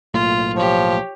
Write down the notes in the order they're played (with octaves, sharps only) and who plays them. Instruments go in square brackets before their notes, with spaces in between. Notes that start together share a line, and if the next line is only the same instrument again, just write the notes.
[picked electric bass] B1 A2 A#3 [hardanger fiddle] F4
[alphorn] F3 [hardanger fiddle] G4 C#5